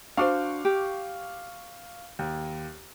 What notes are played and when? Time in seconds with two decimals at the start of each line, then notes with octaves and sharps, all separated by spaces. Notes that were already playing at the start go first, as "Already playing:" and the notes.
0.17 D4 F#4 C5 F5 C#6 D6
0.65 G4
2.19 D#2